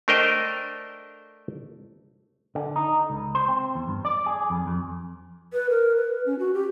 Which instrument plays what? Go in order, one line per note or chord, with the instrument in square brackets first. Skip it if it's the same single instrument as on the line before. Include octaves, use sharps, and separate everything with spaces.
[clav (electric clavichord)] A3 D4 A#4 C5 D#5 G5
[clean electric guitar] D3
D#4
C#2
C5
C4
E2
G2
D5
G#4
F2
F2
[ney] B4
A#4
B4
C#4
F#4
G4